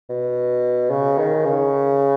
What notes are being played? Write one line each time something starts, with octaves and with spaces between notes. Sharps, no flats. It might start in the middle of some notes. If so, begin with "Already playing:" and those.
B2
C#3
D#3
C#3